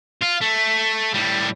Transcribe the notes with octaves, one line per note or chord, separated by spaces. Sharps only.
F4
A3
A2 G3